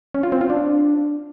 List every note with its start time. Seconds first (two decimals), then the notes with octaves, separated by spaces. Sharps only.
0.14 C#4
0.23 F4
0.32 C4
0.41 F4
0.50 D4